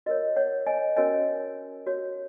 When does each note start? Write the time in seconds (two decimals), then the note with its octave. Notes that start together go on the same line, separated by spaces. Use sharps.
0.06 F#4 A#4 C#5 D#5
0.36 C#5 F#5
0.67 D#5 G#5
0.96 C#4 F#4 A#4 C#5 D#5 G#5
1.87 F#4 C#5